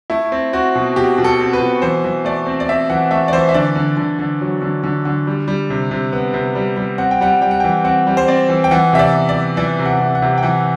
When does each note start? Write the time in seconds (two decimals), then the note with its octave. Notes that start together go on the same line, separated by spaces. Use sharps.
0.10 A3 E4
0.32 C4
0.53 C4 F#4
0.75 B2
0.96 B2 G4
1.18 B2
1.24 A4
1.40 C4
1.53 B4
1.61 B2
1.82 E3 C5
2.04 E3
2.25 A3 D5
2.46 C4
2.60 D5
2.69 C4 E5
2.90 E3 F#5
3.11 A3 E5
3.28 D5
3.33 E3 C5
3.49 E5
3.54 D3 D5
3.75 D3
3.97 D3
4.19 D3
4.41 F#3
4.62 D3
4.84 D3
5.05 D3
5.27 G3
5.48 G3
5.70 C3
5.91 C3
6.13 B3
6.34 C3
6.55 G3
6.77 G3
6.98 C4 F#5
7.11 G5
7.21 G3 F#5
7.41 G3 G5
7.51 F#5
7.60 E3 G5
7.84 C4 F#5
8.07 G3
8.17 C5
8.28 C4 D5
8.49 E3
8.64 G5
8.71 E3 F#5
8.93 C3 E5
8.99 D5
9.13 B3
9.29 D5
9.35 E3
9.57 E3 D5
9.79 C3
9.86 F#5
10.00 C3
10.15 F#5
10.22 C3
10.38 G5
10.43 E3 F#5